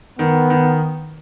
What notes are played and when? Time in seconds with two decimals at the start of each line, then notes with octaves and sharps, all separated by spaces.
0.19 D#3 B3
0.50 D#3